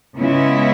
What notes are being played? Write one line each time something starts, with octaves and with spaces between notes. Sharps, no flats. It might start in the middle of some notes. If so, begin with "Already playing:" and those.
C#3 G#3 B3 E4